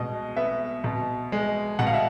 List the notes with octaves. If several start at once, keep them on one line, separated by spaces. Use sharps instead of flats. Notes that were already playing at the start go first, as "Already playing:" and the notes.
Already playing: B2 G#3 D#5
B3 E5
B2
G#3
B2 F#5
F5
E5